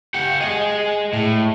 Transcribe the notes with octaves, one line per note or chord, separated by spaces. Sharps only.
G4 F#5
G#4 D#5
A2